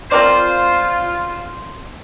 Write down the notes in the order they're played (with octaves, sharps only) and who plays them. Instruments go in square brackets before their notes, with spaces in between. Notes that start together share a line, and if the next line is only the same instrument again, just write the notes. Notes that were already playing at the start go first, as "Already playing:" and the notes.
[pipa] C4 A#4 D5 [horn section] F4 [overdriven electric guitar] C5